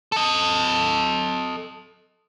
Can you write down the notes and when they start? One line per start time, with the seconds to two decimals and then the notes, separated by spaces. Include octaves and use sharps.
0.12 A4 D#5